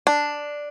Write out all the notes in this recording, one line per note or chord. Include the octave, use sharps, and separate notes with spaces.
D4